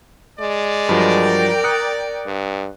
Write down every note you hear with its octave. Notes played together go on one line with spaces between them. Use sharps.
G#3 D5
G2 F3 F#3 A#4 G5
D#6 F#6 C#7
G2